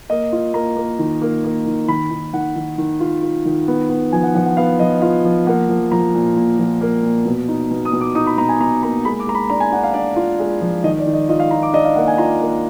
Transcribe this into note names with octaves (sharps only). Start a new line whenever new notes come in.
A#3 D#5
F4
A#3 A#5
A#3
D#3
A#3
A#3
D#3
D#3 B5
D#3
D#3 F#5
D#3
D#3
F4
F4
D#3
B3
B3
F3 G#5
F#5
F3 F#5
F#5
B3 F5
F3 D#5
F4 F5
F3
A#3 F#5
F3
F3 A#5
A#2
A#2
F3
A#3
A#2
B2
D#4
B2
D#6
B2
D6
D#4 D#6
B5
B2 A#5
G#5
B2 A#5
A#3 A#5
G#3 B5
D6
G#3 A#5
B5
D4 A#5
G#5
D4 F#5
F5
D4 D5
F4
G#3 D5
F3
D#3 D#5
D5
D#3
D#5
F4 D#5
F5
F4 A#5
D6
D4 D#5
F5
A#3 F#5
G#5
F4 A#5
A#3